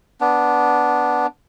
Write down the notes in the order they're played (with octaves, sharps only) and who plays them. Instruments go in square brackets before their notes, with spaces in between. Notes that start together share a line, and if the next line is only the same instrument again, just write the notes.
[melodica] B3 D4